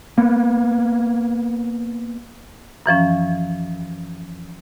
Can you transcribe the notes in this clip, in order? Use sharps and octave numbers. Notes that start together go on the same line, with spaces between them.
A#3 B3
F#2 E3 F3 C#4